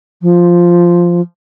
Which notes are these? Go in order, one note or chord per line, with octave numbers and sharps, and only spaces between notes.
F3